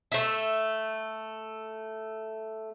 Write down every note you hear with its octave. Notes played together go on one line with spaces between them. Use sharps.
A3 E5